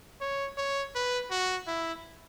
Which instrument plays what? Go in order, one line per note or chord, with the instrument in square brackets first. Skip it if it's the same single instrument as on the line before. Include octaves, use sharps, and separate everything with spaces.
[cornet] C#5
C#5
B4
F#4
E4